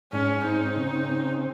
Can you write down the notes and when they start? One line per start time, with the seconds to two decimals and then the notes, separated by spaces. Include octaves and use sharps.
0.12 G#2 C#4
0.44 C4 D#4
0.76 C#3
1.09 C4